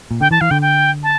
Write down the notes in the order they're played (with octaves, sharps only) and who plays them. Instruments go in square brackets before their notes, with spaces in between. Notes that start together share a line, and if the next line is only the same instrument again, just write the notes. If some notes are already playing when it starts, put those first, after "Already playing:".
[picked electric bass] A#2
[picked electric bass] D3 [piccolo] G5
[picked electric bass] E3 [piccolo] A5
[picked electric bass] E3 [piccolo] F5
[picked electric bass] D3 [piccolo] G5
[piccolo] G5
A5